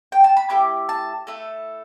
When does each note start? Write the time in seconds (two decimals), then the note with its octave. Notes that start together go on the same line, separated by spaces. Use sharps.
0.12 G5
0.24 A5
0.37 B5
0.50 A3 E4 G4 D6
0.89 A5
1.27 A3 E4 A4